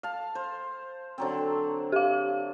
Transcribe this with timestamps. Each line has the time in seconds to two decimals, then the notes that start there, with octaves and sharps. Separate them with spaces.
0.03 F5 A5
0.35 C5
1.18 D3 F#3 C4
1.92 G4 F5